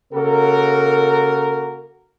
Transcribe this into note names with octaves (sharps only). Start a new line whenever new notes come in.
C#3 A#3 F#4 A4 A#4